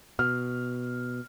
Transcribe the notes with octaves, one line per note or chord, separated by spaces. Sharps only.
B2 F6